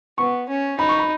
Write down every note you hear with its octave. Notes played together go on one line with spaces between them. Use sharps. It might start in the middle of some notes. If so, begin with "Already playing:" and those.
B3 C#6
C#4
D#4 B5
C#6
B5